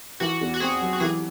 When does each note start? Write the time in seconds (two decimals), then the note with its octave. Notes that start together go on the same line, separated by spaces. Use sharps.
0.20 E3 F#4
0.41 E2
0.54 F#4
0.60 C4 G#4
0.81 F#3
0.93 F#4
1.00 E3 G#4